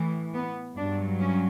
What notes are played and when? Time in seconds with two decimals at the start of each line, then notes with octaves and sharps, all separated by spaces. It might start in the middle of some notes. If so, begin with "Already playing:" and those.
Already playing: A2 E3
0.34 B3
0.76 G2 F#3 D4
1.19 C#4